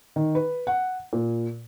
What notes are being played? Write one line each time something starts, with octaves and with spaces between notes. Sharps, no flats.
D#3
B4
F#5
A#2